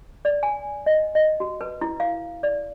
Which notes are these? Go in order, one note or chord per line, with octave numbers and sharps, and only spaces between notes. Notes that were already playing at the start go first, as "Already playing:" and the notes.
D5
G#5
D#5
D#5
F#4
B4
E4
F5
D5